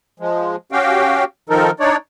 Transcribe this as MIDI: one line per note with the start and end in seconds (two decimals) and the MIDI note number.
0.20 0.56 53
0.20 0.56 56
0.72 1.24 61
0.72 1.24 66
0.72 1.24 67
0.72 1.24 77
0.72 1.24 79
1.49 1.71 51
1.49 1.71 53
1.49 1.71 63
1.49 1.71 69
1.49 1.71 70
1.80 1.96 62
1.80 1.96 63
1.80 1.96 73
1.80 1.96 74